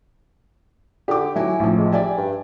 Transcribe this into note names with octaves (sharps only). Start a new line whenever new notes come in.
D3 G4 D6
F#3 E4 G#5
A1 F3
G#3
G3 D5 E5 G#5
G2